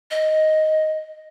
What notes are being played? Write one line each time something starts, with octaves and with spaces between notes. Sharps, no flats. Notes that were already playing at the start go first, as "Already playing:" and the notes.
D#5